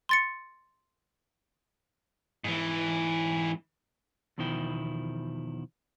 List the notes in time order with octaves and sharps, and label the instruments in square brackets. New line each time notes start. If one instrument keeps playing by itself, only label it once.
[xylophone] C6 A6 C#7
[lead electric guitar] G#2 E3
[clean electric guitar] E2 B2 D#3 F3 E4 G5